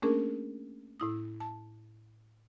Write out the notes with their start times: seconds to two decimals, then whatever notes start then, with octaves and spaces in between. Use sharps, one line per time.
0.02 A3 A#3 C#4 D4 G#4 A#4
1.00 A2 E4 D#6
1.40 A5